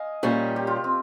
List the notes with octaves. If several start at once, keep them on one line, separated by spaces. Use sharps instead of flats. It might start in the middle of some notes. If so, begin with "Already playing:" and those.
Already playing: D#5 F5 G#5
A#2 G3 C#4
G4
F4
C4